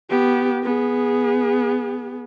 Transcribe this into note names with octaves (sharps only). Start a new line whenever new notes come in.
B3 G4
B3 G#4